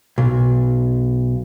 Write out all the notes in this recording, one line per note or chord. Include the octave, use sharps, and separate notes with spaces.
B1